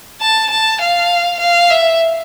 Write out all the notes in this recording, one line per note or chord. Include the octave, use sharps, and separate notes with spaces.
A5
A5
F5
F5
E5